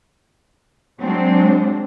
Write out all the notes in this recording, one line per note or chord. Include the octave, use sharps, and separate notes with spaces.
F#3 G#3 C4 D4